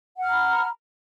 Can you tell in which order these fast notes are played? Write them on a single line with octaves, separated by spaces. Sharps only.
F#5 F6 A#5 B5